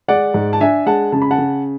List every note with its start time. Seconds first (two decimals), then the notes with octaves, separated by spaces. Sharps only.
0.08 G#3 D5 F#5
0.34 G#2
0.53 A5
0.60 D4 E5 G#5
0.86 G#3 F#5 A5
1.12 C#3 A5
1.22 B5
1.31 F#5 A5
1.38 C#3